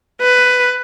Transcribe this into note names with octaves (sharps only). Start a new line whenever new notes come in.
B4